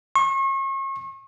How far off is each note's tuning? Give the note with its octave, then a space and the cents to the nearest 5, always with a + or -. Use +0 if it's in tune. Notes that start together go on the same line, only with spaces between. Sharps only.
C#6 -40